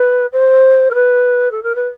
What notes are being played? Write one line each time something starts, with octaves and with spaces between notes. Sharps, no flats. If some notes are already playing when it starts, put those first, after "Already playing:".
Already playing: B4
C5
A#4
B4
A4
A#4
B4